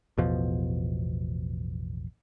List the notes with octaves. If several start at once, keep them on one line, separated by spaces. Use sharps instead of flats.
A1 E2 B2 F3